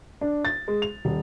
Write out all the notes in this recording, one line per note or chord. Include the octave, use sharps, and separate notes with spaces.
D4
A6
G#3
F7
D#1